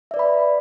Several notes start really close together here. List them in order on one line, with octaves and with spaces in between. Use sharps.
E5 D5 B4 B5